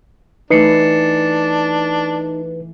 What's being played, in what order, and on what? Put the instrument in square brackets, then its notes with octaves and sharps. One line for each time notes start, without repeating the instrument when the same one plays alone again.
[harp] E3 A3 [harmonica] D4 [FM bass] D#4 [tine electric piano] B4 C7 C#7